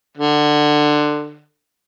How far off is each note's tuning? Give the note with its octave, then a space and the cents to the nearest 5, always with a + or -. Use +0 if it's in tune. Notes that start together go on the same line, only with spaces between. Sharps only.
D3 +20